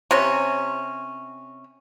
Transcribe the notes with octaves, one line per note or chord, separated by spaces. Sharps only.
C3 C#4